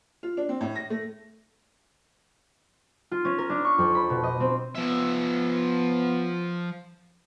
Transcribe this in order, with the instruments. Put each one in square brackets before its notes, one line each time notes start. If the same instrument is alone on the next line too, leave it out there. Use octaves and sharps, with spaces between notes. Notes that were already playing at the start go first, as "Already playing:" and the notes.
[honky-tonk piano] F4
D4
C4
A2
A#6
A3
[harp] F4
C#4
A#4
D4
C#6
F2
B5
B2
D#5
C4
[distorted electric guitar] F3 E5 [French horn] B3